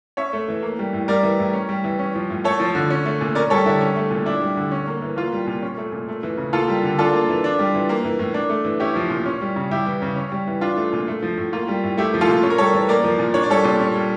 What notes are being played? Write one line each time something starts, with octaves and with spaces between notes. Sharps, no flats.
C#4 C#5 E5
A3
E3
A#3
G3
A2
G3 A#4 D5
E3
A2
C#4
G3
E3
C#4
F3
A2
A3 A4 C#5
F3
D3
C#4
A3
A#2
C#4 A#4 D5
G3 A4 C#5
D3 E4
C#4
A3
A#2
D4 E4
G3
D3
C#4
A#3
E3
A#3 F4
G3
A#2
C#4
A3
A#2
A3
E3
C#3
A#3 F4 A4
G3
D3
D4 F4 A4
A#3
E3
D4
G3
E3
A#3
E3
A2
D4
A3
E3
C#4 E4 G4
F3
A#2
C#4
G3
C#3
G3 E4 G4
E3
C#3
C#4
G3
E3
D4 F4
A3
A#2
A3
F3
A2
A#3 F4
G3
A2
A3 E4 G4
F3
F4 A4
A#2
C#4
A#4
G3 A4 C#5
E3
A#3 A#4 D5
F3
A#2
D4 C#5
D5
G3 A4 C#5
A#2
C#4
G3